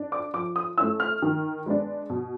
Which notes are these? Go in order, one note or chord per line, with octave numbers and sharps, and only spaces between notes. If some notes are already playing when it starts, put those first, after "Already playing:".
Already playing: D4
D6
F3 D6
D#6
A3 C#4 E4 E6
F6
D#3
G#3 B3 D4
B2